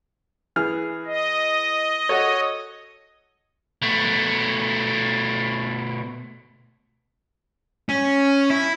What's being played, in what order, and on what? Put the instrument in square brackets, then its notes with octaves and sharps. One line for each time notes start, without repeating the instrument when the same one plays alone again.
[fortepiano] E3 G#4 F6
[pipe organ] D#5
[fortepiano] F#4 A4 C#5
[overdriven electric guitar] B2 A3
[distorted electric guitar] C#4
E4